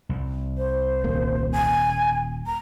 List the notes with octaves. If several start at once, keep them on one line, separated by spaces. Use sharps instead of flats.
C2
C5
D#1 A#3
G#5
A#5